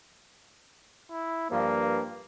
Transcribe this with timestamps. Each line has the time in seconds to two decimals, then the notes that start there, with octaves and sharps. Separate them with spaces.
1.11 E4
1.51 G2 F3 A#3